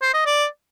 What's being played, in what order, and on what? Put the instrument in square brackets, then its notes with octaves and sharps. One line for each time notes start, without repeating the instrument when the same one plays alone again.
[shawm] C5
D#5
D5